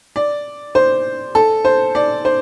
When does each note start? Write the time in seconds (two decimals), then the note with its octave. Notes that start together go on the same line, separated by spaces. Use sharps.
0.16 D5
0.75 C5
1.35 A4
1.65 C5
1.95 D5
2.25 C5